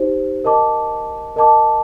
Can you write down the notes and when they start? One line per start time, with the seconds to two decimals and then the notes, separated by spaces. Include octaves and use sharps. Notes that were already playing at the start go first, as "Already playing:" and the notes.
Already playing: D#4 G4 C5
0.44 A#4 D#5 A5 D6
1.36 A#4 D#5 A5 D6